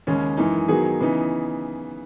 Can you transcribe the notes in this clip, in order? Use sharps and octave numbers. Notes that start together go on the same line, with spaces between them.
D#2 C#3 G#3 C#4
F#2 E3 G#3 D#4
D#3 F#3 B3 D#4 G#4
C#3 E3 B3 D#4